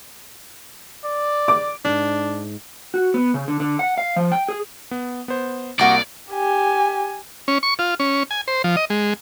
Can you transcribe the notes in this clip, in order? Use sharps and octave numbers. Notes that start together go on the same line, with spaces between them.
D5
D6
C2 G#2 D4
F#4
B3
C#3
D3
D3
F#5
F5
F3
G5
G#4
B3
B3 C5
C2 A#3 F#4 D5 D#5
G4 G#5
C#4
C#6
F4
C#4
G#5
C5
F3
D#5
G#3